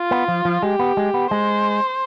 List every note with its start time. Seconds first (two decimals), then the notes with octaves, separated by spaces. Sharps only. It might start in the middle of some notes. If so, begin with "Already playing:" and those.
Already playing: F4
0.11 B3
0.28 F3
0.45 F3
0.62 G#3 G4
0.79 B3
0.97 G#3
1.14 B3
1.30 G#3 C5